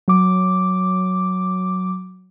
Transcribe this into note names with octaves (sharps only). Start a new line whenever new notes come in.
F#3 D6